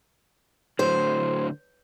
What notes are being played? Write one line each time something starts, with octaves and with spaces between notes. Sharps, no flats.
A2 D3 F#3 C5